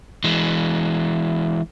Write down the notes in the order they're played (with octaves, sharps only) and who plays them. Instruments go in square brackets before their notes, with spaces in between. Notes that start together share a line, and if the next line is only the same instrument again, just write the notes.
[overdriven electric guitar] E3 G#3